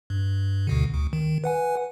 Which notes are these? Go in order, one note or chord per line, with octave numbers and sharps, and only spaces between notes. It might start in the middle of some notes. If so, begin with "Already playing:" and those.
G2
D2 B2 D3
D2
D#3
B4 F#5 G#5